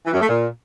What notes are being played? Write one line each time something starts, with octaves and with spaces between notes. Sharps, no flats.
E3
F#2
A3
A#2